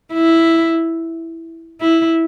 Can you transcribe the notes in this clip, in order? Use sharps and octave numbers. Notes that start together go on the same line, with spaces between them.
E4
E4